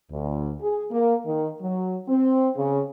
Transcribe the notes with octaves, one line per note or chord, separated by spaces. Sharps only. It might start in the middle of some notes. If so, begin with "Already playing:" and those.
D2
G#4
A#3
D#3
F#3
C4
C#3